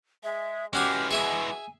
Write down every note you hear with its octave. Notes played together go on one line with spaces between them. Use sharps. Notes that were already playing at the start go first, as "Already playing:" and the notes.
G#3 E5
E3 G#3 C#4 F#4 G4 D#6 F6
B2 G#4 E5 G#5 D#6